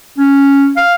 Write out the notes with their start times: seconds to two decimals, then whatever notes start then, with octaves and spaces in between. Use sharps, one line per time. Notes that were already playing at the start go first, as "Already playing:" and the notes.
0.18 C#4
0.77 F5